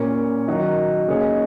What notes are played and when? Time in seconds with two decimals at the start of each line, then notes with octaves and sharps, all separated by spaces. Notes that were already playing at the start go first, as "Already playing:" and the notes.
Already playing: A#2 A#3 C#4 A#4 C#5
0.48 D#3 F#3 D#4 F#4 A#4
1.08 C#3 A#3 D#4 G#4 C#5